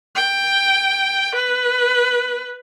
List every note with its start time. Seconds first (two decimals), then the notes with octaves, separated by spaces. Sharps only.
0.15 G5
1.35 B4